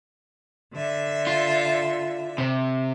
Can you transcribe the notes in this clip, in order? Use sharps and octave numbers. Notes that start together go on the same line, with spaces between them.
D3 E5
F4
C3